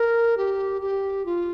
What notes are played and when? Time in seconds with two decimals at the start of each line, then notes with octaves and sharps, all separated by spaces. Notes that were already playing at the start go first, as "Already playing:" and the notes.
Already playing: A#4
0.37 G4
0.82 G4
1.26 F4